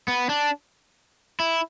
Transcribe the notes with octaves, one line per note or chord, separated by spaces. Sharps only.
B3
D4
E4